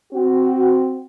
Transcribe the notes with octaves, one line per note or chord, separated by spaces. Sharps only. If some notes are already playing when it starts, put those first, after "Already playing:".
C4 F#4